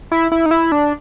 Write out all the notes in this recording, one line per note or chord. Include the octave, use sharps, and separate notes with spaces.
E4
E4
D#4
E4
D4